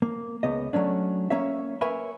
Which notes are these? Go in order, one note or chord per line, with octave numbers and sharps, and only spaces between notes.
A#3
C#2 B3 D#5
F#3 A3 C#4 D4
A#3 C#4 C#5 E5
A#4 B4 C#5 E5 G#5 B5